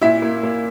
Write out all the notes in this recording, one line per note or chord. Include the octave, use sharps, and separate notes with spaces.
A#2 E4 E5
A#3
A#3